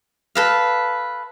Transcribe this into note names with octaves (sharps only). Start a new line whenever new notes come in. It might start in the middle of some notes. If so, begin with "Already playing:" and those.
A4 B4 F5